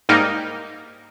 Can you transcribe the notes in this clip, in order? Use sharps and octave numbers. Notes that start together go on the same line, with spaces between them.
G#2 G3 A#3 D#4 A#4